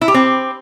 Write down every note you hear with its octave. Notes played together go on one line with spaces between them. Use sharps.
E4
G4
C4